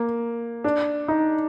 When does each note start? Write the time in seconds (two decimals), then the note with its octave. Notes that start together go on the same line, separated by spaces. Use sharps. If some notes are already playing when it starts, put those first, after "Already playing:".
Already playing: A#3
0.64 D4
1.08 D#4